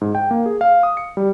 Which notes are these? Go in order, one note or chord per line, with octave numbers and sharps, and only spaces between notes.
G#2
G5
A#3
G#4
F5
D#6
C#7
G3